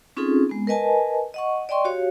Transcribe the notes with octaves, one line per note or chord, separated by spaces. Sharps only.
C4 C#4 D#4 F4 G#4 A4
G#3 B3
A#4 B4 D#5 G#5 A5
D#5 F#5 C#6
D5 D#5 G5 C6 C#6
F#4 G4 C#5 F5